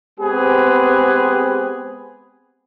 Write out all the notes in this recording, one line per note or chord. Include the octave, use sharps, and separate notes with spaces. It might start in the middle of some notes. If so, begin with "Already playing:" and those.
G#3 B3 C4 G4 G#4 B4